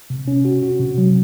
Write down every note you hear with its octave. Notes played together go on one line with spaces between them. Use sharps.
C3
C#4
F#4
F#4
C3
F#3